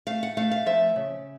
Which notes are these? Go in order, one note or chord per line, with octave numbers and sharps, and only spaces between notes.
A3 F5
F#5
A3 F5
F5
F3 E5
C#3